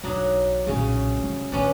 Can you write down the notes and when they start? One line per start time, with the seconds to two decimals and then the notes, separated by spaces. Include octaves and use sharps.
0.04 B1 E2 F#3 D4 D#4
0.67 B1 A#2 C#3 C#4
1.19 C3 G#3
1.52 A1 D#3 B3 C#4 D4